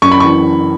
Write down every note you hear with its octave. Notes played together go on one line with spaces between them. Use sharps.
F#2 C#6
B5
E3 C#6